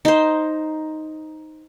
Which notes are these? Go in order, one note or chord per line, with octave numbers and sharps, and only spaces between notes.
D#4 C5